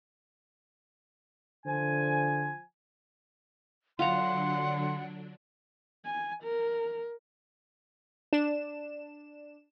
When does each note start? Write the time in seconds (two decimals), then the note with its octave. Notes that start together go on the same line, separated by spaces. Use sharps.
1.66 D3 F3 G#5
3.99 D3 F#3 D4 F4 F#5 A#5 C6
6.05 G#5
6.43 A#4
8.33 D4 E7